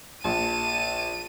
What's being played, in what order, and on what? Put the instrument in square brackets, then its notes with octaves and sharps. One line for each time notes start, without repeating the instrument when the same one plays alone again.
[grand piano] A#1 [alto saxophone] A5 [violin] D#7